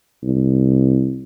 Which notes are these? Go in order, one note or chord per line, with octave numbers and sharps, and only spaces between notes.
C2